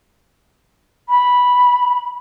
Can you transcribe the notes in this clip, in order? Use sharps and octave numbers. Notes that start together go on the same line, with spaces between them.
B5